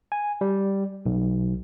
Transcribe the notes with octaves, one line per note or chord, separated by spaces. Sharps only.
G#5
G3
B1